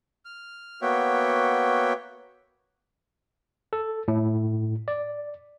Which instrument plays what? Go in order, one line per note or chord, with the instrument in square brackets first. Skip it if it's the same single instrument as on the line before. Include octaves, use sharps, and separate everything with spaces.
[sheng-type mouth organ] F6
A#3 B3 F#4 C#5 E5 G5
[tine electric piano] A4
A2
D5